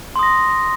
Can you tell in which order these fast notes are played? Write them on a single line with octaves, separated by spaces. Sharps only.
C6 D#6 A#6